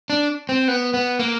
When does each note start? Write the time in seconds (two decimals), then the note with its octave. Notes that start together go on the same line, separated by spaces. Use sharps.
0.10 D4
0.49 C4
0.68 B3
0.94 B3
1.19 A#3